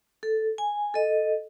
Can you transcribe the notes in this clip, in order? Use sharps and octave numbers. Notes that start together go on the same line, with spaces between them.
A4
G#5
A4 D#5